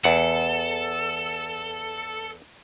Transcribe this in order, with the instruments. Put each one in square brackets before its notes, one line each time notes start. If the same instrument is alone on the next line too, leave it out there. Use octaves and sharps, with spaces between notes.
[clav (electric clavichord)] E2 F#5 [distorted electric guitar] A4